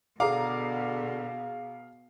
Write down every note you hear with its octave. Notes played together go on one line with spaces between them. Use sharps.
B2 D3 G#4 F5 A#5 D6